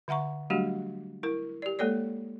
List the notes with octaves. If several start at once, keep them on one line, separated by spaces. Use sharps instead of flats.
D3 E5 F#5 A#5 C#6
F#3 G3 A3 D4 F#4 G4
E4 A#4
G4 D5
G#3 A#3 A4 C#5 D5